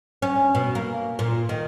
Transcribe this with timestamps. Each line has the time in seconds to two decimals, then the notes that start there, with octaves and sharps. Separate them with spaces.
0.22 C#4
0.55 B2
0.75 A#3
1.19 A#2
1.49 D#3